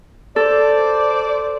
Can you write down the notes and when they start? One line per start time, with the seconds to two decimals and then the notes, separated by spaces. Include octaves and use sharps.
0.36 A4 C5 D5